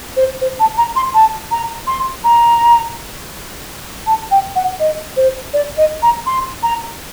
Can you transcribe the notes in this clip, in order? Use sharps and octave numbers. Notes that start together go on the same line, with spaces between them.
C5
C5
A5
A#5
C6
A5
A#5
C6
A#5
A5
G5
F#5
D#5
C5
D5
D#5
A#5
C6
A#5